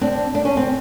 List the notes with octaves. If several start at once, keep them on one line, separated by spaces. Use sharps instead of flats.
C4 D4
D4
C#4
C4